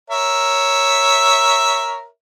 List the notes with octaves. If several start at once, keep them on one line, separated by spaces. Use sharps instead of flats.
A#4 C#5 E5